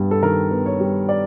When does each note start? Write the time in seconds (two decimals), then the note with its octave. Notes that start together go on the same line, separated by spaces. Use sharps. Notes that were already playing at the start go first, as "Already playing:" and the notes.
Already playing: G2 G3 B3
0.11 A4
0.22 D#3 A#4
0.51 B3
0.66 C#5
0.80 G3
1.09 D5